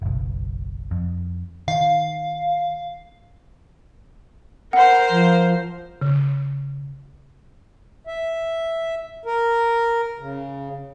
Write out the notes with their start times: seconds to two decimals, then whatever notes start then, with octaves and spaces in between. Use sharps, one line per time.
0.02 F#1 B1
0.91 F2
1.68 D#3 F5
4.73 A#4 C5 F#5
5.10 F3
6.02 C#3
8.07 E5
9.25 A#4
10.19 C#3